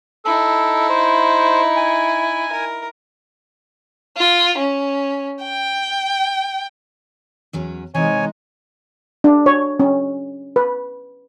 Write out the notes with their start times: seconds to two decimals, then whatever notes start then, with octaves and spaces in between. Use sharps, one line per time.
0.25 D#4 E4 A4
0.90 C5
1.77 G#5
2.52 A#4
4.17 F4
4.58 C#4
5.44 G5
7.53 E2 F#3 C#4
7.94 C3 E3 G#3 C4 D#4 C#5 G#5
9.24 D4
9.46 C#5
9.80 C#4
10.56 B4